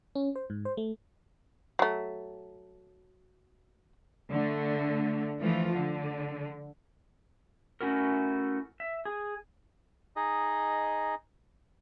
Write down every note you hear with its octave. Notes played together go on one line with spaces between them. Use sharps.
C#4
C5
G#2
C5
A3
F#3 A3
D3 A3
E3 F3 A3 F4
D3
A3 C#4 E4 F#4 A#4
E5
G#4
D#4 G#4 D#5